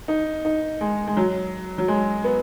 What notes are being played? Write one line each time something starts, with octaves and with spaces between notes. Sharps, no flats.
D#4
D#4
G#3
G#3
F#3
F#3
G#3
B3